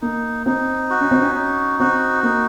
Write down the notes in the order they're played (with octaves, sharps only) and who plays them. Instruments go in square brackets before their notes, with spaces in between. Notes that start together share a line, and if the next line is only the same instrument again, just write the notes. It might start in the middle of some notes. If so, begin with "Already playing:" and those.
[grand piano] A#3 [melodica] D#4
[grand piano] C4 [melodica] D#4
[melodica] F#4
[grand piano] C#4
C4
C#4
[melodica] D#4
[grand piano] C4 [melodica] F#4
[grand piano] A#3 [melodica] D#4